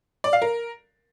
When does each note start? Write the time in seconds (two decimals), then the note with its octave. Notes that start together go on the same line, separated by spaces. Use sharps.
0.24 D5
0.33 F5
0.42 A#4